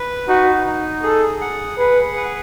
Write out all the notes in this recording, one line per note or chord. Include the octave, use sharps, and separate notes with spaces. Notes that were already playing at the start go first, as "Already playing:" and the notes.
Already playing: B4
D#4 F#4
D#4
G#4 A4
F#5
G#4 B4
B4